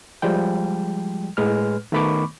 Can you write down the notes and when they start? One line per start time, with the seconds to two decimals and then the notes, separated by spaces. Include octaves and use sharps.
0.22 F3 G3 G#3 G5
1.37 A2 G#3 B4 F6
1.92 D#3 A3 B3 B5 C#6 D6